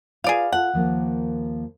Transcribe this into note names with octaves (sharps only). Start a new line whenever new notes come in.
F4 G#4 B4 D5 F5
F4 A4 F#5
D#2 F3 A#3